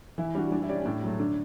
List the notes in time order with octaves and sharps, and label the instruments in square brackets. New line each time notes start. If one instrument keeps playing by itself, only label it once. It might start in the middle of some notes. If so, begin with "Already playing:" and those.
[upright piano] E3 [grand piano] E4
[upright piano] G3 D4 F#4
[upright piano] G3 [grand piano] D4
[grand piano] E4
[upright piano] C#4 G4 D5 [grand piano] D4
[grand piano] C#4
[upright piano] A2 [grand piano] D4
[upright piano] F#3 A3
[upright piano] D3 [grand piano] D4